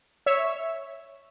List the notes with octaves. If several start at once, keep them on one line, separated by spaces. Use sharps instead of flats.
C#5 E5